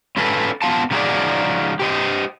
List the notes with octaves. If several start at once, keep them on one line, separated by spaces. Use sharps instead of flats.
C#4 F4 A4 B4 D#5 G#5
B3 F4 F5 A5
C#3 F3 D#4 F#4 G#4 D5
G4 C5 D#5